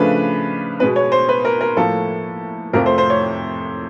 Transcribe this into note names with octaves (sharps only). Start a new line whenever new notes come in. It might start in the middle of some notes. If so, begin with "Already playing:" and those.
Already playing: C#3 F3 A3 D4 B4
B2 G#3 B3 B4
C#5
C5
B4
A#4
A#4
A2 F3 A#3 A4
F2 C3 F3 A3 A#4
C5
C5
C#5